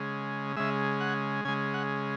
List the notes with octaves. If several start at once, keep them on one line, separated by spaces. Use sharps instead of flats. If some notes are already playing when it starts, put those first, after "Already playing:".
Already playing: C#3 G#3
C#3 G#3 E5
F#5
C#3 G#3 G#5
F#5